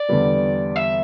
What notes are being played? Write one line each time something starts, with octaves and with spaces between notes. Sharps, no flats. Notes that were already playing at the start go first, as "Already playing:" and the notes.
Already playing: D5
E2 D3 G3 B3
E5